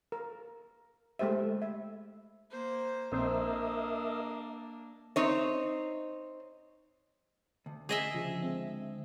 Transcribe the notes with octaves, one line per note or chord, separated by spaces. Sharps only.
A#4
G#3 A3 G4 C5 E5
E5
A#3 C5
A#1 A#3 C4 D4 A#4 C5 D#5 E5
C4 D#4 C#5
D2
G#4 D#5 E5
C#3 F3
G#3 C4